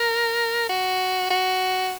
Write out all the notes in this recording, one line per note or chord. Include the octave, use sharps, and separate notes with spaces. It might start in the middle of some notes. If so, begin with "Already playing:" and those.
Already playing: A#4
F#4
F#4